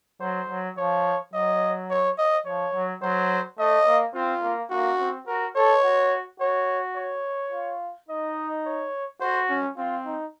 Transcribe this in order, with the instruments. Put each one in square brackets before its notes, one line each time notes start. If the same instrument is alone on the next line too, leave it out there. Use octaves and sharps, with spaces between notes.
[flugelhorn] F#3 [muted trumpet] C5
[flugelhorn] F#3
[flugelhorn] F3 [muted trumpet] C#5
[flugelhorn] F#3 [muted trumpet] D#5
[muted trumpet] C#5
D#5
[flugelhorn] F3 [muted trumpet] C#5
[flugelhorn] F#3
[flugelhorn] F#3 [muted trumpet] C5
[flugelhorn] A3 [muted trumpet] D#5
[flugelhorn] A#3
[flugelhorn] C4 [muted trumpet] F4
[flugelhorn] A#3
[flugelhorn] A#3 [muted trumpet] F#4
[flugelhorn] C4
[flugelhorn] F#4 [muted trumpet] A#4
[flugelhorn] A4 [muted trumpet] C#5
[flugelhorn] F#4
[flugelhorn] F#4 [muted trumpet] C#5
[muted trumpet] C#5
[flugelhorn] F4
[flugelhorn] D#4 [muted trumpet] D#5
[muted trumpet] C#5
[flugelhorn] F#4 [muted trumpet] C5
[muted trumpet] C#4
[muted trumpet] C4 [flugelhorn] F4
[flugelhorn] D#4